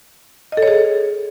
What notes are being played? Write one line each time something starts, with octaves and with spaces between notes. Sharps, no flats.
D#5
A4
C#5
G#4